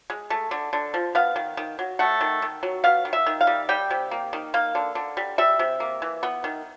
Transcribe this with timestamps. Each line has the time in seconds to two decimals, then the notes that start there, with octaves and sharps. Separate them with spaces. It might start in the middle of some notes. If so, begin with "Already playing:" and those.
0.10 G#3
0.30 A3
0.51 D3
0.73 D3
0.94 F3
1.15 B3 F5
1.36 D#3
1.57 D#3
1.79 F#3
1.99 A3 F#5
2.21 D#3
2.42 D#3
2.63 F#3
2.84 B3 F5
3.05 D#3
3.13 E5
3.26 D#3
3.41 F5
3.47 G3
3.69 G3 G5
3.91 C3
4.11 A#3
4.33 D#3
4.54 A#3 F5
4.75 D3
4.95 D3
5.17 G3
5.38 G3 E5
5.59 C3
5.80 A#3
6.02 E3
6.23 B3
6.44 D#3